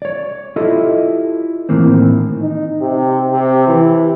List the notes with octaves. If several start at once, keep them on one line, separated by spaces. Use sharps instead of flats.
C#5 D5
E4 F4 G4 A4 D#5
A2 D#3 E3 A#3 C4
D#4
C3
C3
E3